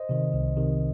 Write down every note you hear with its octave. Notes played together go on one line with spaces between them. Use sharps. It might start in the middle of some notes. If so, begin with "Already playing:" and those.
Already playing: C5 D#5
C3 D#3
C2
C3 D#3